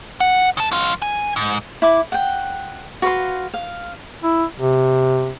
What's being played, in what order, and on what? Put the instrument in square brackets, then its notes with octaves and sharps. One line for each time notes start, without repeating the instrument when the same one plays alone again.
[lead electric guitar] F#5
C#3 A5
F#3 F4
G#5
G#2
[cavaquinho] E4 B5 D6
F#5 G5
F#4 B4 F5 C6
F5
[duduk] E4
C3